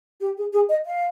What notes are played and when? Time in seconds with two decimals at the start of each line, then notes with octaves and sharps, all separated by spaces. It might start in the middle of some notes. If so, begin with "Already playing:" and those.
0.20 G4
0.37 G#4
0.53 G#4
0.69 D#5
0.86 F5